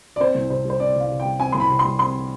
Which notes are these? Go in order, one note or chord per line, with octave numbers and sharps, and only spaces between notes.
D5
C4 C5
C2
C3 C5
G3 C5
C4 D5
C2 F5
C3
G5
G3
C4 G#5
C2 C6
B5
C3
C6
G3
C4 C6